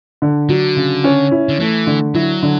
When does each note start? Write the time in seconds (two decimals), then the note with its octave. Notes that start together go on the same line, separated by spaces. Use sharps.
0.22 D3
0.49 D3 F#3
0.76 C#3
1.04 C#4
1.31 E4
1.49 D3
1.59 E3 A3
1.87 D3
2.14 F#3 E4
2.43 D3